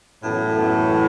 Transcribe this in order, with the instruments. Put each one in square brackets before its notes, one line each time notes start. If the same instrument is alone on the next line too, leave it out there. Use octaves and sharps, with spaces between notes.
[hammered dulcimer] F#2 E3 B3 A4 [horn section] A2
[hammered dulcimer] F#2 E3 B3 A4
E3 B3 A4